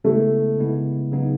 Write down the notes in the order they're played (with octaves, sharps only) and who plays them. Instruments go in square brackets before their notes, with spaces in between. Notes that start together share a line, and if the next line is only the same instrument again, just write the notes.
[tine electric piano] C#3 G#3 B3 E4 [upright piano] A3
[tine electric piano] C#3 G#3 B3 E4
C#3 F#3 B3 D#4